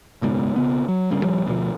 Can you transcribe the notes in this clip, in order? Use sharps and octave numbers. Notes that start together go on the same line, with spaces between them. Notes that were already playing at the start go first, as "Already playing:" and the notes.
F#1 C#2 G#2 B2
B1 C#3 B3
F#3
G1 G2 C#3
D#1 F3 G3
D2 B2 F3